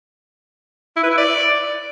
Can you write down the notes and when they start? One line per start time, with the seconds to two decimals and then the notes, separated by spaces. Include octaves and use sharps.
0.97 E4
1.04 B4
1.11 E4
1.18 D5